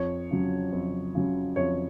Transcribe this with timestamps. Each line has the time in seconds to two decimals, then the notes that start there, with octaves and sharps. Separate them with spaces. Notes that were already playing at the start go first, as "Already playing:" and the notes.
Already playing: F2 C#5
0.31 C#3 F#3
0.72 F2
1.15 C#3 F#3
1.56 F2 C#5